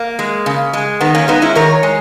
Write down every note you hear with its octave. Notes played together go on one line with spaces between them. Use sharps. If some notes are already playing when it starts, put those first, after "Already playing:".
Already playing: A#3
G#3
C#3
G#3
D#3 B3
A#3 C#4
G#3 B3 D#4
C#4 E4
D#3 A#4 C#5
G#3